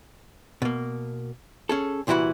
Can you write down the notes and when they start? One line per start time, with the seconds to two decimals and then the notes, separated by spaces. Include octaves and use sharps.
0.62 B2 A#3
1.69 C#4 G#4 A4
2.07 C2 A#2 E3 E4 F#4 B5